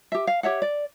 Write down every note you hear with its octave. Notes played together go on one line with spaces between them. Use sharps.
G4 E5
F5
G4 C#5 E5 F#5
D5